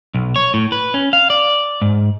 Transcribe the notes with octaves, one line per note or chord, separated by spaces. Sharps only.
B1
C#5
A2
B4
C#4
F5
D5
G#2